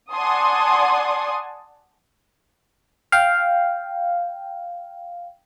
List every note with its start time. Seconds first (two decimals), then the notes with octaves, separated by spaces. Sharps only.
0.13 D5 F#5 G#5 A5 C6 D#6
3.12 F5 G5